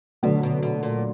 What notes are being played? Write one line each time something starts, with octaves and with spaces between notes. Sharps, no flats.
B2 D3 F#3 A3
B2
B2
A#2